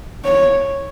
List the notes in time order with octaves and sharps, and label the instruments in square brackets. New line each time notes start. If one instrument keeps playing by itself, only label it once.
[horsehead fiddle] C#5